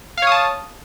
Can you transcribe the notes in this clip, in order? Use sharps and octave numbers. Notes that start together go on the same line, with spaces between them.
C#5 F5 A5 D#6